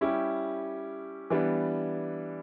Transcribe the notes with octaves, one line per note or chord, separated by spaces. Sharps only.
G3 C#4 E4 G4
E3 G3 B3 D4